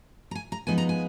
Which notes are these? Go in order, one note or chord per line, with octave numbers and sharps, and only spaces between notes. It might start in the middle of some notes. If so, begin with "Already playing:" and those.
A#5
G#5
A#5
F3 G#3 B3 D#4 G#5
A#5
G#5